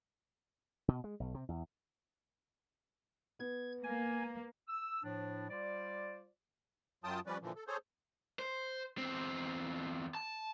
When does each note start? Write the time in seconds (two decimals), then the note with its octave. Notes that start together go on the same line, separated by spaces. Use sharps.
0.88 B2
1.04 G#3
1.20 B1
1.34 C3
1.49 E2
3.39 B3 G#6
3.84 A#3 G#5
4.68 E6
5.03 A2 F3 D4
5.49 G3 F4 C5 D5
7.04 F#2 F#3 F4 G5 A5 D#6
7.26 F3 G3 C#4 B4 D5
7.42 A#2 D3 E3 F3
7.56 A4
7.68 G#4 A4 C5 C#5
8.39 C5
8.98 E2 C4
10.15 A5